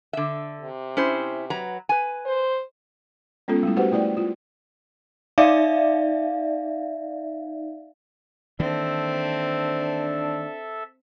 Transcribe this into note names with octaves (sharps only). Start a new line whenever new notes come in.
D3 E5
C3
C#4 E4 C5
F#3 B4 A#5
B4 G#5
C5
G#3 B3 C#4 F4 A4
G3 A3 E4
F#4 G4 B4 C5 F#5
A3 E4 D5 G5
F4
D#4 D5 E5 F5
D#3 E3 A#3 C4 D4 A4 E5